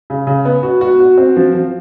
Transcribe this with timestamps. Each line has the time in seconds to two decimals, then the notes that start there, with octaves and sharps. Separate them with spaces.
0.10 C#3
0.27 C#3
0.45 B3
0.63 F#4
0.81 F#4
1.00 F#4
1.18 C4
1.37 F3
1.55 F3